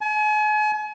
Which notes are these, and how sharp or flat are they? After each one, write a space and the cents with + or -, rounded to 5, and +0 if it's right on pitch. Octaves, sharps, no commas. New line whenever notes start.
G#5 +40